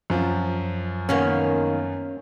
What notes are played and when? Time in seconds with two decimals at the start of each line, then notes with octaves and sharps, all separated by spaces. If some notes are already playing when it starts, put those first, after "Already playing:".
0.10 F#2 F3
1.09 D#3 A#3 B3 C#4